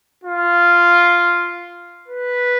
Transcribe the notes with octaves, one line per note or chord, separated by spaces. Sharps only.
F4
B4